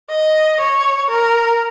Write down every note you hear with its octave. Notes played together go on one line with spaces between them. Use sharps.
D#5
C#5
A#4